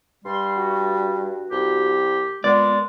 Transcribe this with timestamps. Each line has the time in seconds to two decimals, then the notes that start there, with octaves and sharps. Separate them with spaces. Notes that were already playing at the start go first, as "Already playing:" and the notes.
0.25 G2 G3 C6
0.56 F#4
1.52 C2 G4
2.44 A#2 G#3 B3 D5